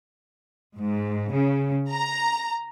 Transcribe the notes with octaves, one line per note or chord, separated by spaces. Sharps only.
G#2
C#3
A#5